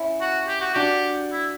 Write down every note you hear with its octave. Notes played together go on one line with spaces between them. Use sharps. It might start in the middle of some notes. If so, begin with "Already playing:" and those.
Already playing: C#4 E4
F#4
G4
F#4
D4 F#4 G4
E4